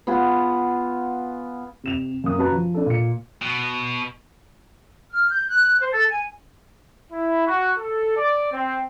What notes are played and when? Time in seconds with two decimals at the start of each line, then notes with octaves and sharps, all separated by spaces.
0.07 B3 F4 G#4 F#5
1.84 C3 E7 F7
2.24 F#2 A#3 D#6
2.38 C#4 F#4 B4 A5 A#5
2.52 F3
2.74 D4 A4
2.86 A#2 C#7
3.42 B2
5.12 F6
5.29 G6
5.50 F#6
5.80 C5
5.93 A4
6.09 G#5
7.11 E4
7.47 F#4
7.78 A4
8.17 D5
8.52 C4